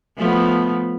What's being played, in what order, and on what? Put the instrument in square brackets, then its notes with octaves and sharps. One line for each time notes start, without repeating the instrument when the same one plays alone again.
[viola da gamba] F3 A3 B3